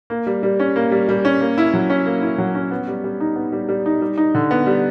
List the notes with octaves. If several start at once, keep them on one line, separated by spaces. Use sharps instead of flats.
A#3
G3
G3
C#4
A#3
G3
G3
C#4
A#3
E4
F#3
C#4
A#3
E4
F#3
C#4
B3
G3
G3
D#4
B3
G3
G3
D#4
G3
D#4
D3
B3
G3